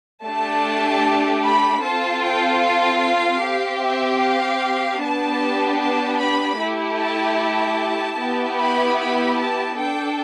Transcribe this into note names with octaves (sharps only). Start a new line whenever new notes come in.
A3 D4 G4 A5
B5
C4 F4 A4 A5
G5
F5
C4 G4
E5
F5
B3 D4 G4 A5
A5
B5
A3 E4 G4
A5
A5
B3 E4 G4
B5
B5
A5
D4 A4 G5